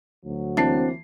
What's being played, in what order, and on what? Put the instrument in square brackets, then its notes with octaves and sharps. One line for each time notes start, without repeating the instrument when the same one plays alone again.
[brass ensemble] D2 F#3
[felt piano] E3 A#3 C7 [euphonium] C4 [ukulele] D4